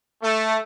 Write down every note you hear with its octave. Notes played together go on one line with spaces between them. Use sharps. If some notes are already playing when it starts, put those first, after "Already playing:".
A3